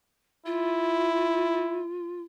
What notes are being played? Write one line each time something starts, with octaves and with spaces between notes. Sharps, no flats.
E4 F4